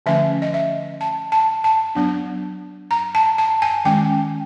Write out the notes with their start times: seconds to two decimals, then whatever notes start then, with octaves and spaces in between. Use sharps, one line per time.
0.06 D3 F3 A3 C#4 E5
0.42 D#5
0.54 E5
1.01 A5
1.32 A5
1.64 A5
1.95 F#3 B3 D4
2.91 A#5
3.15 A5
3.38 A5
3.62 G#5
3.85 D#3 G#3 C#4 G5